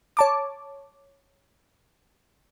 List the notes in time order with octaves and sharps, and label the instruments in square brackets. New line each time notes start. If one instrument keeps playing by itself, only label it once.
[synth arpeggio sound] C#5 A5 D6